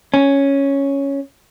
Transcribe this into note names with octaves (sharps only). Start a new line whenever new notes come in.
C#4